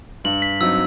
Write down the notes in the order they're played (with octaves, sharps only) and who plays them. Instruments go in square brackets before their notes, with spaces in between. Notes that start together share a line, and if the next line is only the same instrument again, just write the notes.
[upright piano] G2 [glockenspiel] F#7
[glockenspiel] B6
[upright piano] F#3 C4 D#4 [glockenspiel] E6